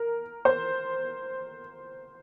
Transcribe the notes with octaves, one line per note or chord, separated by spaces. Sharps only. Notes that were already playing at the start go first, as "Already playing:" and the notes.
Already playing: A#4
C5